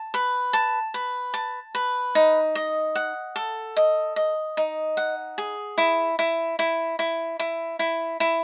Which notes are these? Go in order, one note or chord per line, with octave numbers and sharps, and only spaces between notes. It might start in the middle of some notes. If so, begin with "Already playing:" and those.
Already playing: A5
B4
A5
B4
A5
B4
D#4
D#5
F#5
A4
D#5
D#5
D#4
F#5
G#4
E4
E4
E4
E4
E4
E4
E4